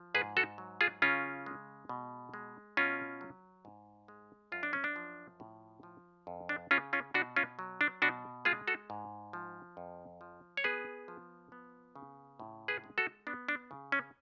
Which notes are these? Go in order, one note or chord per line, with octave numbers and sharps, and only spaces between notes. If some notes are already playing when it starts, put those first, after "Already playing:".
Already playing: F3
G#2 G#4 B4
F#4 A4
F#3
F4 G#4
C#3 C#4 F4
G#3
B2
G#3
B2 C#4 F4
F#3
G#2
G#3
F#2 F4
D4
C#4
D4
F3
A2
F3
F2
D4
C#3 C#4 F4
C#4 F4
B2 D4 F#4
C#4 F4
F#3
D4
B2 D4 F#4
G#3 F4 G#4
F#4 A4
G#2
F3
F2
F3
C#5
B3 G#4 B4
F3
B3
C#3
A2
G#4 B4
G#3
F#4 A4
B3 D4
D4
C#3
C#4